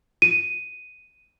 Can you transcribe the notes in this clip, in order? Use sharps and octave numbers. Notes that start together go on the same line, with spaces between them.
D#7